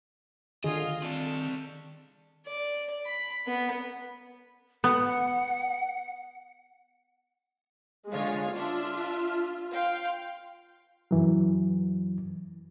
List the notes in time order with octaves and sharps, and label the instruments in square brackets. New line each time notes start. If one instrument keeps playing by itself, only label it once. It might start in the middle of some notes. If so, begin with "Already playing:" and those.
[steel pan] D3 G#4 [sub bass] D#3 [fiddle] F4 F5 [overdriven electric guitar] D#5
[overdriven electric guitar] C4 D5 [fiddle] A4
[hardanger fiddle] D5
B5
B3
[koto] B3 [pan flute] F#5
[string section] D3 F4 C#5 [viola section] G#3
[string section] D4 E5 [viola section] F4
[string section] F5 G5 C6
[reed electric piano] F#2 E3 F#3